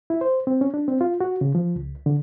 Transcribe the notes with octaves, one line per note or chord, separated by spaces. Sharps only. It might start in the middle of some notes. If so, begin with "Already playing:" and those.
E4
C5
C4
C#4
D4
C4
F4
F#4
C#3
F3
C#2
D3